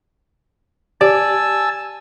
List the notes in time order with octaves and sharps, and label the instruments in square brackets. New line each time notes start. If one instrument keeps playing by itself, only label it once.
[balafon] G4 [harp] D5 [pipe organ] G#5 A5 E6